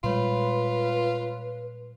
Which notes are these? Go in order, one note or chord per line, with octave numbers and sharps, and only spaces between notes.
A#2 G3 G#3 F4 B4 C#5 B5 C6